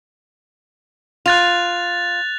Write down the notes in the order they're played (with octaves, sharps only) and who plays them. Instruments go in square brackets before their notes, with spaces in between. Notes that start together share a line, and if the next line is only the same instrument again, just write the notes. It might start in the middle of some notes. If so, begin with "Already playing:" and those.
[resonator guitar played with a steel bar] F4 [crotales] F#6 A6 F7